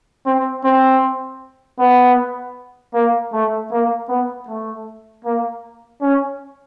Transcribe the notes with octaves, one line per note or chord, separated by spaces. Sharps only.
C4
C4
B3
A#3
A3
A#3
B3
A3
A#3
C#4